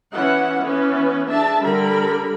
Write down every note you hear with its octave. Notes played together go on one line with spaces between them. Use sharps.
E3 B3 C#4 E4 F#5
E3 B3 C#4 B4
D4 G#4 E5 A5
D3 G3 A#4 B5